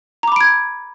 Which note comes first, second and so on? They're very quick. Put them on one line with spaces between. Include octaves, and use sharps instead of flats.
A#5 D6 B5 D7 G#6